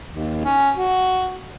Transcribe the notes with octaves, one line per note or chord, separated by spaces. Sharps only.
D#2
C#4
F#4